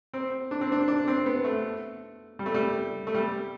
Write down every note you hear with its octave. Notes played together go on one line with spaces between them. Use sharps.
C4
D4
C4
D4
D4
C4
B3
A3
G3
A3
G3
A3
G3